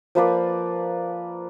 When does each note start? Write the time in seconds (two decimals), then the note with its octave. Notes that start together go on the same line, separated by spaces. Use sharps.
0.15 F3 A#3 B4 D5